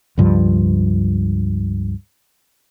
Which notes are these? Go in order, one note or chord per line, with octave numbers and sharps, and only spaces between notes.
C#2 G2 F3